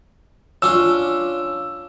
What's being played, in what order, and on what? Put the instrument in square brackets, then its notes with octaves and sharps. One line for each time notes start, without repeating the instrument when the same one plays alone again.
[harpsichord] C#4 D4 F4 [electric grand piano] E6